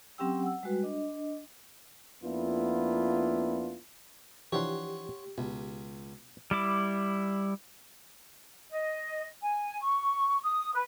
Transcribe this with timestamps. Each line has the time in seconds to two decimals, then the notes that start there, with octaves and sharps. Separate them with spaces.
0.18 F#3 C4 C#4 G4 G5 E6
0.43 F#5 E6
0.63 G3 G#3 F#4 B4
0.83 D4 D#5
2.22 F2 A#3 B3 D4 E4 F4
4.52 E3 F3 D4 G4 C#5 F#5 C6
5.38 C#2 B2
6.51 G3 E4 D6
8.71 D#5
9.41 G#5
9.82 C#6
10.43 D#6
10.74 B4